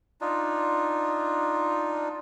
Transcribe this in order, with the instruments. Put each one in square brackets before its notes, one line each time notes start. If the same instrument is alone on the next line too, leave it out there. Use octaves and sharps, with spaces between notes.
[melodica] D4 D#4 F4